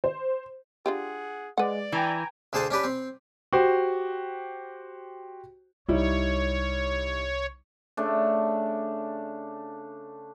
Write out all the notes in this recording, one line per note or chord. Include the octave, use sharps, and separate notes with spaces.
C5
D4 F4 G4 G#4 F#5
G#3 B4 D5 F#5
E3 G5 G#5 A#5
D2 D3 G#4 C5 A5
C#4 D4 G4 B4
C4
F#4 G4 C5
C2 G3 D#4 E4 C#5
C#3 A3 D4